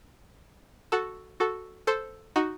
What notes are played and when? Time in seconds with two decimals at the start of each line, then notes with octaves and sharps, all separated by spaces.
0.92 F#4 A4
1.40 F#4 A4
1.87 A4 C5
2.36 D#4 F#4